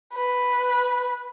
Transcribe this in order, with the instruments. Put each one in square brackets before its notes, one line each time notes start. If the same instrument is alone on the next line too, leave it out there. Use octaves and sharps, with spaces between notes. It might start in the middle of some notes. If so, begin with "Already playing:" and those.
[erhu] B4